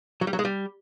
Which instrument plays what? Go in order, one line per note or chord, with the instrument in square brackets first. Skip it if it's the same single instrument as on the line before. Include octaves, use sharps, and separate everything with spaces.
[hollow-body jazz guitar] F#3
G3
F#3
G#3
G3